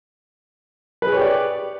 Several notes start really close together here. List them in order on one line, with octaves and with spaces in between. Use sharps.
B4 G#4 C#5 G4 D5